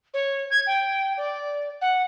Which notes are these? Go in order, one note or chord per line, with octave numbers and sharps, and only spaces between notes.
C#5
G#6
G5
D5
F#5